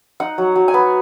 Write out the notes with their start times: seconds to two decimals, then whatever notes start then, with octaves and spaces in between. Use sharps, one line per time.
0.20 D#4 F#5
0.38 F#3
0.56 F#3
0.68 G#5
0.74 B3